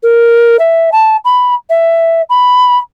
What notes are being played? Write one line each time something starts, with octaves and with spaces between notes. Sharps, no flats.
A#4
E5
A5
B5
E5
B5